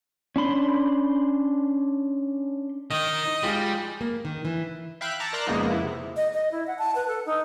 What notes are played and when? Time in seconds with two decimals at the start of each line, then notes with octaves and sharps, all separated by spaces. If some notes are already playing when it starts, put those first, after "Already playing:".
0.36 C#4 D4 B5 C6
2.90 D#3 D#4 D#5
3.43 G3 G#3 F4 G#4
4.01 A#3
4.25 D#3
4.45 E3
5.01 E5 F5 G5 B5 F#6
5.20 A5 A#5 C#6 D6
5.33 A#4 D5 A#5 C6 E6 F#6
5.47 F2 C#3 G#3 A#3 B3 D#4
5.69 B3 E4
5.84 C3
6.16 D#5
6.34 D#5
6.51 E4
6.67 F#5
6.79 A5
6.95 B4
7.08 A4
7.26 D#4